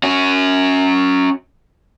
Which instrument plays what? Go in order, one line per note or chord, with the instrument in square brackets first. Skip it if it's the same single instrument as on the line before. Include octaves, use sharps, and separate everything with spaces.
[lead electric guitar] C#4 F#4